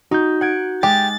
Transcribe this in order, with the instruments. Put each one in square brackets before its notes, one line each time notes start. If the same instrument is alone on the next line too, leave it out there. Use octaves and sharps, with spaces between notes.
[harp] D#4 [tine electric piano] F#4 G6
[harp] F#5 G#6 D7
[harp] G#3 [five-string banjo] G4 [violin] A6